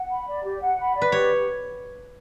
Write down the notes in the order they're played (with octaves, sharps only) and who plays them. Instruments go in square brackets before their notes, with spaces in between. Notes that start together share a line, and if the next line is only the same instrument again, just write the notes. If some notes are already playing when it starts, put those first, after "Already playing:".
Already playing: [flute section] F#5
B5
D5
G4
F#5
B5
D5
[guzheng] B4
[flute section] G4 [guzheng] C#5